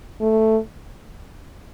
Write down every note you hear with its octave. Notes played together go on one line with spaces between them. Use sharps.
A3